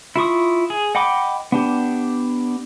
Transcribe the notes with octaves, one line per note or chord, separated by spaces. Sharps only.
E4 F4 C#6 D#6
G#4
D#5 F#5 G5 B5 D6
B3 D4 G4